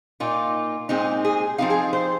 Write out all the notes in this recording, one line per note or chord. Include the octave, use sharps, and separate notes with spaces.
A#2 A#3 D#4 F4
A#2 G#3 C4 D#4
G#4
F3 C4 D#4 F5
G#4
C5